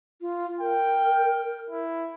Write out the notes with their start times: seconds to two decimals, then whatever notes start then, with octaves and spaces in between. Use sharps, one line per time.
0.21 F4
0.61 A#4 G5
1.71 E4